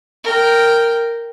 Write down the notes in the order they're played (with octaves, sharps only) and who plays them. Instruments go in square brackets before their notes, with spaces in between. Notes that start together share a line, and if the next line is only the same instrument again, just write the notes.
[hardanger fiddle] A#4 G5